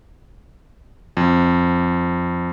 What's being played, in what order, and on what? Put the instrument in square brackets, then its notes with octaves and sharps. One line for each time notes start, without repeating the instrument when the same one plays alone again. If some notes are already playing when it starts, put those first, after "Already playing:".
[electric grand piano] F2